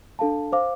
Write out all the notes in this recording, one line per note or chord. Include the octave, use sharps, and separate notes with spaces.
D4 A4 F5 A5
C5 F5 D6